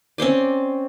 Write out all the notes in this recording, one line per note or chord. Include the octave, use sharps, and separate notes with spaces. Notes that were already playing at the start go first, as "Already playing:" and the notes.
C4 C#4 C5 D5